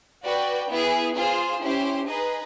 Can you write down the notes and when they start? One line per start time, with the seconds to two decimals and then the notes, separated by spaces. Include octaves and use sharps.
0.23 F#4 B4 D5 G5
0.69 B3 E4 G#4
1.15 F4 G#4 C5
1.61 C#4 E4 G4 C5
2.07 D#4 G#4 B4 D#5